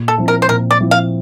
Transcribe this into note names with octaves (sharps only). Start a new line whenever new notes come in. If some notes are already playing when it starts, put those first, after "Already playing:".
Already playing: A#2
A4
F3 C4 E4
A#4
C5
A#2 A#4
D5
F3 C4 E4
F5